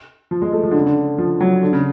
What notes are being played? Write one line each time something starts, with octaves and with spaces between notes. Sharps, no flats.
F3
G#3
A3
F3
D3
C#3
D3
F3
F#3
D3
C#3